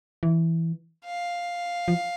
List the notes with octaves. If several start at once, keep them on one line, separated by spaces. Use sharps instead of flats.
E3
F5
F3